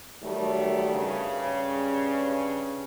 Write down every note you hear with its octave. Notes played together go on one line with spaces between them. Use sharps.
D#3 F#3 G3 A3
G2 C#3